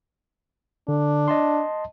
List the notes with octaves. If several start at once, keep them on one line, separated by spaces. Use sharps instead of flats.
D3 D4
D#5 A5 C6